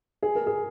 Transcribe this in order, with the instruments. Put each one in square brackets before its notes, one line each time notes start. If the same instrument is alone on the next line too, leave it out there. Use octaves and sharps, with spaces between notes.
[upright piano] G#4
A#4
G#4